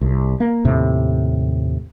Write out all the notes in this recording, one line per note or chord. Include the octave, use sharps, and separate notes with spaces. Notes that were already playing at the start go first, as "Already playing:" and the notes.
C2
A#3
D#2 A2 C3